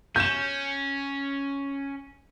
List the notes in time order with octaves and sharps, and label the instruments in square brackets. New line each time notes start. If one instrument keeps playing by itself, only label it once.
[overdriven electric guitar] C#4 [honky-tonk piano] G6 E7